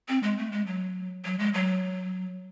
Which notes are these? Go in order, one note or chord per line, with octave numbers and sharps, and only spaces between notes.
C4
G#3
A3
G#3
F#3
F#3
G#3
F#3